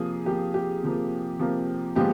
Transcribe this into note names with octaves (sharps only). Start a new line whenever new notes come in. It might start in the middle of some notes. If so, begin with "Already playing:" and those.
Already playing: C3 F3 A#3 G#4
C3 F3 A#3 G4
G4
C3 F3 A#3
C3 F3 A#3
A#2 F3 G#3 B3 G4